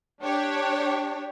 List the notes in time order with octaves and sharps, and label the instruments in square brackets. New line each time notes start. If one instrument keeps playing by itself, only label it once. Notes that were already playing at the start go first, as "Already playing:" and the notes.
[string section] D4 G4 C#5